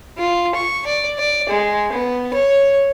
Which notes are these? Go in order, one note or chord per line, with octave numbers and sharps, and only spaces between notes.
F4
C#6
D5
D5
G#3
B3
C#5